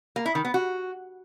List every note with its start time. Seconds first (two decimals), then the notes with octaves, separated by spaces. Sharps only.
0.16 A#3
0.26 E4
0.35 D#3
0.45 B3
0.54 F#4